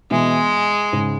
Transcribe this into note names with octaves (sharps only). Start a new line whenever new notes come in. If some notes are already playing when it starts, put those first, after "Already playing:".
B2 E3 G#3
G#2 C#3